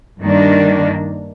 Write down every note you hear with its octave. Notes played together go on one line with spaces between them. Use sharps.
G2 D#3 G3 A#3 D4